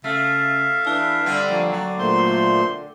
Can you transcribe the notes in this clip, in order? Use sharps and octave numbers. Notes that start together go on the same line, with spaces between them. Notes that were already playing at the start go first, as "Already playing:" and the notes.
C#3 A3 E5 F5
E3 D4 E4
D3 G3 C4
F3 A3 A#3 D4
F#3 D5
A#2 A3 A#3 C5 C6